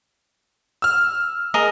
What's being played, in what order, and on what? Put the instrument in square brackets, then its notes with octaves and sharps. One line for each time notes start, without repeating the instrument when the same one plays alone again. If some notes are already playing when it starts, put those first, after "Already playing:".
[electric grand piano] E6 F6
[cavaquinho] G#4 A#4 D#5